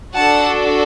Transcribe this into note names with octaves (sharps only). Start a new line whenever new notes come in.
D4 F#4 A4 F#5 A5